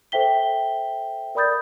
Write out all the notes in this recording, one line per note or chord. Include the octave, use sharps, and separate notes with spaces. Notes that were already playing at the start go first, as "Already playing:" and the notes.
A4 C5 E5 G5 B6 G7
A#4 D5 B5 D#6 G6 A6